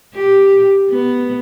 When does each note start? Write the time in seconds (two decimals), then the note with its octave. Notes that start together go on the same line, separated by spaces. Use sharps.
0.15 G4
0.89 B3